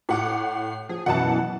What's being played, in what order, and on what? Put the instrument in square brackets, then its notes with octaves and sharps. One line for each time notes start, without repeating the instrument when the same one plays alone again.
[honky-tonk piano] A2 F#5 D6 [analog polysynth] C7
[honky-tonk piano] F3 [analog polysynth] G#4
[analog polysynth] F#2 B2 E3 [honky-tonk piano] F#5 A5